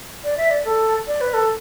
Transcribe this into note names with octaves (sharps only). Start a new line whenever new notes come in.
D5
E5
D5
A4
D5
B4
A4